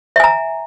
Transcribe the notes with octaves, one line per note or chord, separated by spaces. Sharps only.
E5 G#5 A#5